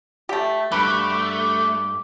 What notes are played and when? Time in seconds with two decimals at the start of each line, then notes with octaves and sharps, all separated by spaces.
0.29 A3 G4
0.72 G2 A3 F#4 G4 B4 D6